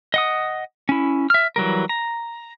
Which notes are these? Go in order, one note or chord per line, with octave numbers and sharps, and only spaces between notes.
D#5 F#5 D#6
C#4 E4
E5 F6
E3 F#3 G3 A#4
A#5